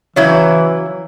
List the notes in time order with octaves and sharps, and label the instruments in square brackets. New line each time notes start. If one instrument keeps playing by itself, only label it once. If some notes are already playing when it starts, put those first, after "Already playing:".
[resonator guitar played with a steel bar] C#3 F#3 E4 [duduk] E3 [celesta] C#5